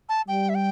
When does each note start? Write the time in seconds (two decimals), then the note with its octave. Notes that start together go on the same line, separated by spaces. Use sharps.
0.09 A5
0.28 G3 G5
0.49 E5
0.55 G5